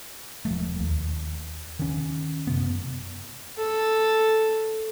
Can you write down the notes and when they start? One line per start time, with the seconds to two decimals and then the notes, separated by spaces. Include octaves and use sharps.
0.45 E1 F3 A3
0.80 D#2
1.79 D#3 C#4
2.47 F#2 C3 B3
3.58 A4